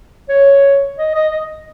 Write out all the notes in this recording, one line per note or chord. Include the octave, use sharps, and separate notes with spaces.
C#5
D#5
D#5
D#5